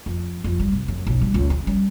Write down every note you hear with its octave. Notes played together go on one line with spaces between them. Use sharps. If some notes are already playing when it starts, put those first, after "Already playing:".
F2
F2
G3
C3
F#2
B1
G3
C#2
C#4
G3